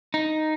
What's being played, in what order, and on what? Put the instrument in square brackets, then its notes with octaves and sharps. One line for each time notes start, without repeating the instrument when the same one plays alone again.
[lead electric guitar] D#4